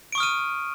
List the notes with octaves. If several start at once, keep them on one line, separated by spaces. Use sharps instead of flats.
C#6 D#6 F6 D7 D#7